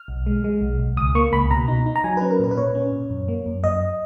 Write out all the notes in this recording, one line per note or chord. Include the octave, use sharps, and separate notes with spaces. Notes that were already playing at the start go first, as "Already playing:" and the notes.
Already playing: F6
B1
G#3
G#3
B1
B1
C#2 D#6
A#3 C#6
C#2 B5
B2 A#5
D#4
D#4
A#5
F#3 G#5
C#4 B4
A#4
A#2 B4
B4
A#2 C#5
C#4
A#2
F#2
A#3
F#2
F#2 D#5